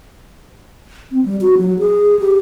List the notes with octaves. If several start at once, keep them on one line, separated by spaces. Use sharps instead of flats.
C4
G3
F#4
F#3
G#4
G4